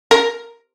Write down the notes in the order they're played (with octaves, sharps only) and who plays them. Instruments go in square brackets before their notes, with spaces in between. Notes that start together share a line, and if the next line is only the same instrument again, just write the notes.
[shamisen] A#4